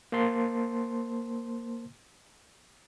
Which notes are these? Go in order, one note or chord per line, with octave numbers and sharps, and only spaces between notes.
A#3 C5 A5 C6